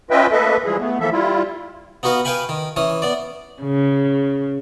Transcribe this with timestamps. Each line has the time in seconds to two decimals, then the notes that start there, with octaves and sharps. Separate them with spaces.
0.11 C#4 F4 B4 D#5 E5 G5
0.32 A3 A#3 A4 B4 D#5 E5
0.64 E3 F3 G3 G#3 G#4
0.80 A3 B3
1.00 E3 F3 A#3 A4 E5
1.12 G3 E4 F4
2.03 B3 D#4 F#4 B4 F5
2.25 B4 F5 G5 G#5 B5
2.49 D#3
2.76 E3 C#4 D#6
3.02 B3 D5
3.63 C#3